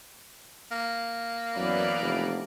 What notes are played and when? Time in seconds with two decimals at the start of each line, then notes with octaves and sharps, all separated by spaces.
0.71 A#3
1.56 F#2 E3 B3 D5
2.01 F1